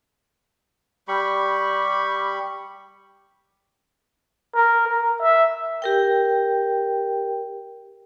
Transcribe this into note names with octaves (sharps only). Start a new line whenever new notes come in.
G3 G4 B5 C#6
A#4
A#4
E5
G4 A#4 G5